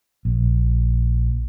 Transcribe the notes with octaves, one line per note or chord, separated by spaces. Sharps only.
A#1